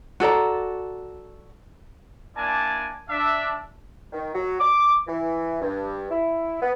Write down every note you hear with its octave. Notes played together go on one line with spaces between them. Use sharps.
F#4 A4 D5 A#5
A#3 D4 E4 D5 G#5 A5
D4 E5
D#3
F#3
D6
E3
G2
E4
B3